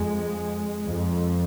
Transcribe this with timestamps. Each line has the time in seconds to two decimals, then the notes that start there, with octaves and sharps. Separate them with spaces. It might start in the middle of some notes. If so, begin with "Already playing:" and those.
Already playing: F2 G#3
0.86 F2